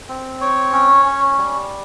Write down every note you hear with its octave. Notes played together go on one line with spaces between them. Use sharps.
C4
C#5
C#4
C#4
G3